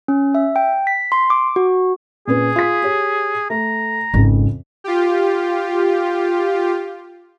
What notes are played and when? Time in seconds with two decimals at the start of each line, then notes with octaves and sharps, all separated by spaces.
0.08 C#4
0.35 E5
0.56 G5
0.87 B6
1.12 C6
1.30 D6
1.56 F#4
2.27 A#2 C#4 G#4 B4
2.56 F4 B6
2.83 G4 C#5
3.50 A3 A#5
4.14 G#1 F2 C#3
4.84 F4 G4